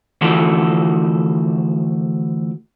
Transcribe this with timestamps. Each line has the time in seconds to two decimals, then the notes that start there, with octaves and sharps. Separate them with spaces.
0.21 D2 E3 F3 F#4 A4